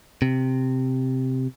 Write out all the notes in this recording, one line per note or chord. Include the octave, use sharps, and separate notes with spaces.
C3